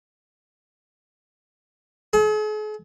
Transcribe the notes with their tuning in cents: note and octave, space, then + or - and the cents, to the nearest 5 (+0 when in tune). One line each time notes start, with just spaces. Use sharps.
G#4 +45